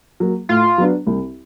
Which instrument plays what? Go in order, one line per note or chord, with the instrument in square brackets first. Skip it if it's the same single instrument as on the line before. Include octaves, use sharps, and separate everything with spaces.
[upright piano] F#3 A#3
[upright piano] A2 [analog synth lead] F4
[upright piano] F#3 B3 D4
C2